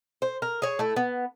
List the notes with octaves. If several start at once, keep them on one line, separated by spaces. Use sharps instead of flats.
C5
A#4
G#4 C#5
A3 E4
B3